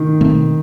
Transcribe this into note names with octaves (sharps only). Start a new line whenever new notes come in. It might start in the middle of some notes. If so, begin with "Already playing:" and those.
Already playing: D#3
B2 A3 C4